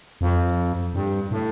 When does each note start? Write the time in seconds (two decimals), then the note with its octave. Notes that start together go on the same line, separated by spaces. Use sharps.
0.21 F2
0.94 G2
1.31 A2